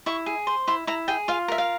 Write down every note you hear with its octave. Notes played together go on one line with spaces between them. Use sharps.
E4 C#6
G#4
C5
E4 C6
E4 A#5
G#4 G5
F4 F5
A#4 E5
F5